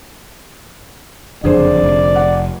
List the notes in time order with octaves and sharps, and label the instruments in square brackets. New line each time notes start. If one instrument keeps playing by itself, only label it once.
[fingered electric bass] F#1 F2 [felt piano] D3 G#4 C5 [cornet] D5
[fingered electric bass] F1
[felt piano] F#5